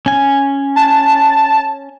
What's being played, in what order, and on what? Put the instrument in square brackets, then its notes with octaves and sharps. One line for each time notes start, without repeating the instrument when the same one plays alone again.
[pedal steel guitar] C#4 G#5
[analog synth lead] A5